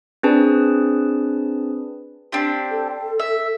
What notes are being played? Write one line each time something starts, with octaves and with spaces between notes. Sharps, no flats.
C4 D4 G#4 B4 A5
C4 D4 G4
A4
E5